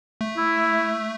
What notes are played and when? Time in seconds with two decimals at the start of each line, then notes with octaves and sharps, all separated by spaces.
0.21 A3
0.37 E4